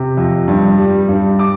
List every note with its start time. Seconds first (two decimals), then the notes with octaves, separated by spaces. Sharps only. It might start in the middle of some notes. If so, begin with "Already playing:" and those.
Already playing: C3
0.17 F2
0.48 G2
0.78 G3
1.09 G2
1.39 D6